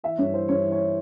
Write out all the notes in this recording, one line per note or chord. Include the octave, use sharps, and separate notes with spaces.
E3 E5
G2 C#5
E3 C5
G2 C#5
E3
C#5